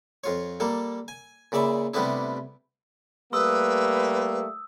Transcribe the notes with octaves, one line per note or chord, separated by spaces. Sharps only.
F2 F4 C#5
G3 A#3 A4
G#5
A#2 C#3 D5 E5 B5
C3 G3 A3 B3 D4 E4
G3 A3 A#3 B4 C6 D#6 E6